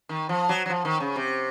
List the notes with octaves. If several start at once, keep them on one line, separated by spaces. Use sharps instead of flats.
D#3
F3
F#3
F#3
F3
D#3
C#3
C3